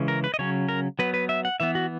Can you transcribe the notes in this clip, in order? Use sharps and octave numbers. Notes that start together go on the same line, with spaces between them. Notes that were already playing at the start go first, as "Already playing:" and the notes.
Already playing: C#3 E3 G#3 C#4
A#4
B4
D#5
C#3 F#3 C#4 C#5
A#4
F#3 B3 B4
B4
E5
F#5
E3 B3 E5
F#4